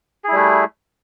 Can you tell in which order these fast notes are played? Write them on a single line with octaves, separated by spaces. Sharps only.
G#4 E4 G3 A3